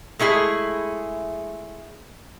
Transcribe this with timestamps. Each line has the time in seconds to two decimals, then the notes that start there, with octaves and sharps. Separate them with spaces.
0.19 G#3 A3 E4 G#4